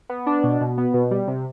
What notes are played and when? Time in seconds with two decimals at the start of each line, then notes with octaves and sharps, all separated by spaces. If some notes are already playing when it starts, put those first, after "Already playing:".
0.09 B3
0.26 D4
0.43 B2
0.61 B2
0.78 B3
0.94 B2
1.11 G3
1.28 C3